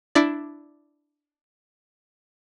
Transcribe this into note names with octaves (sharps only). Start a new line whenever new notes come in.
D4 E4 D5